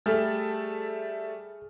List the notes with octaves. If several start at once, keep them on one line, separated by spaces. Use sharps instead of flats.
G3 A3 G#4 A4 F6